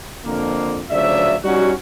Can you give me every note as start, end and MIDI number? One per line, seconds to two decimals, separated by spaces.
0.25 0.80 41
0.25 0.80 50
0.25 0.80 58
0.91 1.33 38
0.91 1.33 49
0.91 1.33 53
0.91 1.33 54
0.91 1.33 74
0.91 1.33 76
1.44 1.71 55
1.44 1.71 61
1.44 1.71 63
1.44 1.71 66